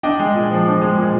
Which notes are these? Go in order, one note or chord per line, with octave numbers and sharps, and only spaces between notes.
D4 D#5 G5
G#3
A#2
F3
D4
G#3
A#2